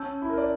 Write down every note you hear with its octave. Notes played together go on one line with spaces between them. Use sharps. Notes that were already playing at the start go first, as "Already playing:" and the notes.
Already playing: C#4 A5 E6 G6
E4
A#4
D5